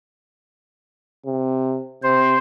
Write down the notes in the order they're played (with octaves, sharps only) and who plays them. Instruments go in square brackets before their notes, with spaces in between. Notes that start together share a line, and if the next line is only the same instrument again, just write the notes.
[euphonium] C3
[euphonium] C3 [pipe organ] C5